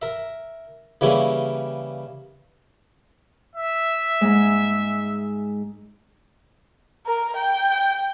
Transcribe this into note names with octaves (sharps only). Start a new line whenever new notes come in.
A#4 E5
C#3 E3 G3 A#3 C#4 E4
E5
G#2 G#3
A#4
G5